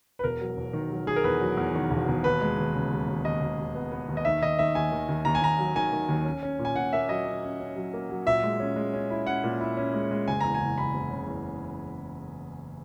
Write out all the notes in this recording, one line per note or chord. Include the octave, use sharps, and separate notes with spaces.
B4
E1 A#4
F#3
E1
D#3
F#3
D#3 G#4
A#4
E2 B4
F#3
E2
D#3
E1
E1
D#2 B4
G#3
D#2
C#3
D#2
D#2
D#2 D#5
D#2
D#2
B3
B3
D#2
D#5
D#3 E5
D#3 D#5
D#3 E5
D#2 G#5
D#3
D#2
D#2 A#5
G#5
D#2 A#5
F#3
D#3 G#5
D#3
D#2
C#4
C#4
A#2
G#5
A#2 F#5
A#3 E5
F#3 D#5
C#4
C#4
C#4
F#3
A#3
F#3
A#2 E5
G#3
C#4
G#3
C#4
E4
C#4 F#5
A#2
E4
C#4
G#3
G#3
F#1 G#5
E2 A#5
G#5
F#1
F#1 B5
F#1
C#3
E2